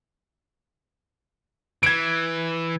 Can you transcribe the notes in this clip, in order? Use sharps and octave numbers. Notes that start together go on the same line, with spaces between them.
E3 G#6 D7